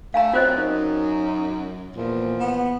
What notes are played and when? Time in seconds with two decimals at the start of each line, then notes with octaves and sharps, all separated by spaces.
0.14 A3 F5 G#5 A#5
0.33 F#2 C4 F4 C5 D#5
0.57 D#4
1.96 E2 A#2 F3
2.40 B3